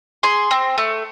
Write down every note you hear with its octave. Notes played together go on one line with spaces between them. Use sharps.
G#4 C6
C4
A3